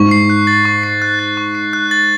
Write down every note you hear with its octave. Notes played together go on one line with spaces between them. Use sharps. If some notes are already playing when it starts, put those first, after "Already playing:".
Already playing: G#2 C#6
C7
F#6
A6
C#6
C7
F#6
A6
C#6
C7
F#6
A6